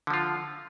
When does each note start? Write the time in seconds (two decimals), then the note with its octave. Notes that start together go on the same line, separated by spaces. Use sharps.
0.07 D3
0.10 F3
0.14 F4